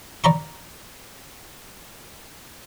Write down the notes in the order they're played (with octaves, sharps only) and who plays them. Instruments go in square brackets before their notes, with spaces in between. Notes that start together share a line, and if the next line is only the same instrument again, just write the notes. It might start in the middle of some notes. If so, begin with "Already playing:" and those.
[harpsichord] D5 A#5 B5 C#6